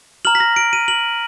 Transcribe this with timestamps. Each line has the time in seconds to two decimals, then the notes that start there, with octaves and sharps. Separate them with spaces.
0.25 A#5 F6 F#7
0.35 B6
0.40 A#6
0.56 D7
0.73 D#7
0.88 F#7